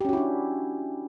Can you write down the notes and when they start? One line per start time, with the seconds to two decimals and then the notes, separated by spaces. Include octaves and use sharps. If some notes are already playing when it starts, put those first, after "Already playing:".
0.01 G4
0.05 C#4
0.09 F#4
0.13 E4
0.17 D4